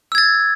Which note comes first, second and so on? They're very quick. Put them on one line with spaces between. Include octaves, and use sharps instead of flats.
E6 G#6 A6